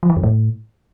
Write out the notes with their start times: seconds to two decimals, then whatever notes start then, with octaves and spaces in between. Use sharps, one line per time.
0.03 F3
0.10 E3
0.17 F#2
0.23 A2